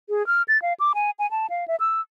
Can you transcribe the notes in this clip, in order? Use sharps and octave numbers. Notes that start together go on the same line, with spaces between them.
G#4
F6
A6
F5
D6
G#5
G#5
A5
F5
E5
E6